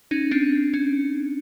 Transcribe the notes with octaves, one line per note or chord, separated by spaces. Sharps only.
C#4 D#4
C4 D4
C#4